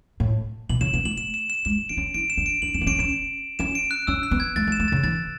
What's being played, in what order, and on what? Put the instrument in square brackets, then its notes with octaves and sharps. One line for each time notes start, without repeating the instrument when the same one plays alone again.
[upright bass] A2
[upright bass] B2 [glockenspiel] F#7
[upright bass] C#3 [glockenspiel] E7
[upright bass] B3 [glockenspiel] E7
[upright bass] A3 [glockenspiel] F#7
[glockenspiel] E7
E7
E7
[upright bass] G#3 [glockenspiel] E7
[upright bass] D4 [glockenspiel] D7
[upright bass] C#4
[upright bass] E4 [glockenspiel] D7
[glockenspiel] E7
[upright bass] D4
[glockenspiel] D7
[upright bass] D4 [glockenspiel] F#7
[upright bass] C#4 [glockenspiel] E7
[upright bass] B3
[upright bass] C#4 [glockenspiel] D7
[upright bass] C#4 [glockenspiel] E7
[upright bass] C#4 [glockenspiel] E7
[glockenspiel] D7
F#6
[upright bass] C#4 [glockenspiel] E6
[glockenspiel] F#6
[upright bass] B3
[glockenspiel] G#6
[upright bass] A3 [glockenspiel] A6
[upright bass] A3
[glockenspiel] E7
[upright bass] A3
[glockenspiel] A6
[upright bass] C#3
[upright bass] E3 [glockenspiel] A6